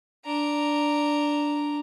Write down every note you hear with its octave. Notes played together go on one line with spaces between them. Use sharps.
D4 A#5